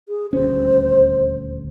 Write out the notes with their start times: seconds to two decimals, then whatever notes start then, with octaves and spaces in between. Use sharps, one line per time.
0.09 G#4
0.33 D#1 D2 C#4 C5